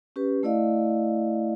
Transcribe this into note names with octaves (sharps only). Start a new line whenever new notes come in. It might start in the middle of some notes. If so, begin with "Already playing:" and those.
C#4 G4 B4
A3 E4 D5 D#5 F5